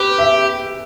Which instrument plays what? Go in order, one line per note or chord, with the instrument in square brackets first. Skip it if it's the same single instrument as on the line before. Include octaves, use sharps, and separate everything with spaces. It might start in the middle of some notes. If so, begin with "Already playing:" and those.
Already playing: [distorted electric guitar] G4 [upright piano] B4
[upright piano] E5